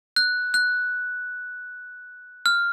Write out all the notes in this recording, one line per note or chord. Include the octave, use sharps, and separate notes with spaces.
F#6
F#6
F6